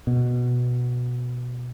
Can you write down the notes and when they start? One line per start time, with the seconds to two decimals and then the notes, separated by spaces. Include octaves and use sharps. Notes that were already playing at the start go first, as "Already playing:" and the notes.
0.07 B2